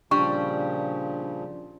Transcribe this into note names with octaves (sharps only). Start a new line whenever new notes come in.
A#2 C#3 F3 G3 D4 C#6